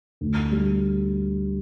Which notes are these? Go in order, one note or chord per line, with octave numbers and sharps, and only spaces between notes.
D2
G3